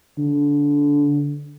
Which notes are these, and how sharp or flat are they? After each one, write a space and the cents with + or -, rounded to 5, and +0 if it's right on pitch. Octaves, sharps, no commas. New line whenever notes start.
D3 -20